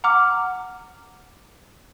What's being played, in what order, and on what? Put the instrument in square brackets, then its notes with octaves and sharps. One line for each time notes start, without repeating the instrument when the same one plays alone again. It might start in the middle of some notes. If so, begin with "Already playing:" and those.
[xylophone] F#5 A#5 D6 F6